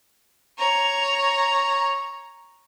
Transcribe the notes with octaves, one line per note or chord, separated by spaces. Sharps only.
C#5 A#5